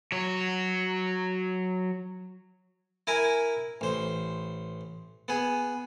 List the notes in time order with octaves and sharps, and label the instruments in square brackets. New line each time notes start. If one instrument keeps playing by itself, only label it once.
[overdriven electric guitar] F#3 C#5
[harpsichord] E4 A#4 G#5
A1 C5
B3 G#4